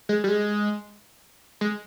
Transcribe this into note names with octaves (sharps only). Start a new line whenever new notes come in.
G#3
G3
G#3
G#3